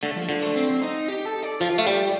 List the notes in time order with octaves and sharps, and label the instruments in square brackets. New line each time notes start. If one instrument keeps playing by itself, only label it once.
[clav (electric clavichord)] D3 [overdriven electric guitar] A3
[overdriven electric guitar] F3
[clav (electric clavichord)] D3 [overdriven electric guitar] F3
[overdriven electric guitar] A3
C4
D#4
G4
A4
D5
[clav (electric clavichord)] F3 [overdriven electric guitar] F4
[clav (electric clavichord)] A3
[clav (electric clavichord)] G3 [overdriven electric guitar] G4